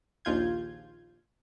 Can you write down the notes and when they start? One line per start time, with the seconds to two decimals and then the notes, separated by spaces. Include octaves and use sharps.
0.25 A#1 D#2 F4 G6 G#6